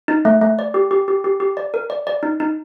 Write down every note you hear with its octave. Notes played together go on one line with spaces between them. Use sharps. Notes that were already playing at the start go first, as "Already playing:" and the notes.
D#4
A3
A3
D5
G4
G4
G4
G4
G4
D5
A#4
D5
D5
D#4
D#4